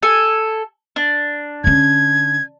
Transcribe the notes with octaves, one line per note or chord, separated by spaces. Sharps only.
A4 G#5
D4
D3 C#4 G#6